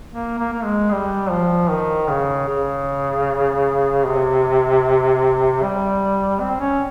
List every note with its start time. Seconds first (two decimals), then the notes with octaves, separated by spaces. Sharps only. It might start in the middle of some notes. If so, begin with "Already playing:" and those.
0.12 A#3
0.39 A#3
0.53 A#3
0.64 G#3
0.91 G3
1.30 F3
1.70 D#3
2.09 C#3
2.48 C#3
4.06 C3
5.62 G3
6.40 C4
6.60 C#4